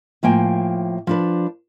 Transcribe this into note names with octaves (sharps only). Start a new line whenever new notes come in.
A2 F3 A#3 G5 G#5
F3 D4 B4